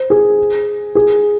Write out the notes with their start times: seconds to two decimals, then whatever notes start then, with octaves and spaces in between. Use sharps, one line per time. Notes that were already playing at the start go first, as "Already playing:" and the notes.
Already playing: C5
0.10 G#4
0.95 G#4